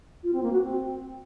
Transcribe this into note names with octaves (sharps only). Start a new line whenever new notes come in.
F4
C4
A#3
F#4
C4